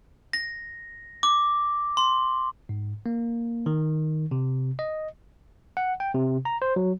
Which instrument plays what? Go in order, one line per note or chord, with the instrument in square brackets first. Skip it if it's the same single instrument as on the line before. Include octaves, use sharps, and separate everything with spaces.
[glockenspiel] A#6
D6
C6
[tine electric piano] G#2
A#3
D#3
C3
D#5
F#5
G5
C3
A#5
C5
F#3